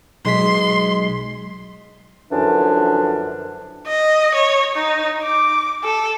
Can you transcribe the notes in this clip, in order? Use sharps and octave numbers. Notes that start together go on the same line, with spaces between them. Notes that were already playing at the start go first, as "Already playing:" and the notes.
B1 G#3 C6 B6
F#2 D3 E3 F3 C#4 D4
D#5
C#5
D#4
D6
A4